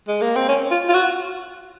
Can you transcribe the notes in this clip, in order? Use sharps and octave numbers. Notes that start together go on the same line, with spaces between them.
G#3
A#3
C4
C#4
F4
F4
F#4